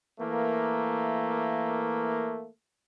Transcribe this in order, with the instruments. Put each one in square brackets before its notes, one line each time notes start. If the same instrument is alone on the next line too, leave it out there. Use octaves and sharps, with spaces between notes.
[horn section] E3 A3 A#3